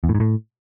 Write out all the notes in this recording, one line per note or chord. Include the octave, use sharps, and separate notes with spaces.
E2
A2
G#2
A2